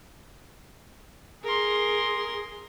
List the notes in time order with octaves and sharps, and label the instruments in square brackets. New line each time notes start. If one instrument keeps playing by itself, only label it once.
[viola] G#4 [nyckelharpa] A#4 C6